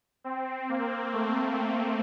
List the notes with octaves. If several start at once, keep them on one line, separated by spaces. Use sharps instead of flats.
C4
A#3
A3